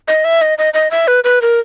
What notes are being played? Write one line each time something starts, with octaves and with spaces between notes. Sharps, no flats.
D#5
E5
D#5
D#5
D#5
E5
B4
B4
A#4